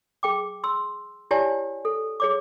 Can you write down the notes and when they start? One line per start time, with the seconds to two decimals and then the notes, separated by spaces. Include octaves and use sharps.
0.23 G#4 G5 D6
0.64 C6 E6
1.31 E4 G4 C#5 D5 G#5 A5
1.85 A4
2.20 G#4 C#5 D6